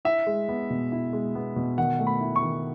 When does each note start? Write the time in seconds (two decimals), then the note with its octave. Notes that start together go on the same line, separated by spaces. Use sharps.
0.05 E4 E5
0.27 G#3
0.49 B3
0.70 B2
0.92 E4
1.13 G#3
1.35 B3
1.56 B2
1.77 D#3 F#5
1.99 A3
2.07 B5
2.21 E4
2.36 C#6
2.43 D#3